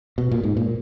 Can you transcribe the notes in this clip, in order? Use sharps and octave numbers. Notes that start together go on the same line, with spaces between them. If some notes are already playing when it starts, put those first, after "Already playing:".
B2
A#2
G#2
A#2